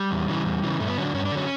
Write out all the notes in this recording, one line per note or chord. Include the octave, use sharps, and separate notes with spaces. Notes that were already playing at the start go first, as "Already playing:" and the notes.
Already playing: G3
E2
C#3 E3
E2
C#3 E3
G2 A3
B3
D3 F#3 C#4
D4
G2 C#4
D4
D3 F#3 C#4